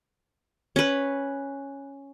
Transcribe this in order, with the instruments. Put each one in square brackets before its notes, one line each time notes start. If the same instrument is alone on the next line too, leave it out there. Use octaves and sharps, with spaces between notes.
[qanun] C#4 B4